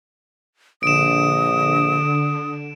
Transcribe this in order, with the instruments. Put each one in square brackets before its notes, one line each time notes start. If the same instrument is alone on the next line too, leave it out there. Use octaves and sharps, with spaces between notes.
[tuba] A#1 [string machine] D3 [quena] D#6 [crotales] D7 E7